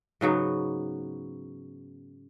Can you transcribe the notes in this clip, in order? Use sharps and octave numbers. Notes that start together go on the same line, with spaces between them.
G#2 C#3 F#3 B3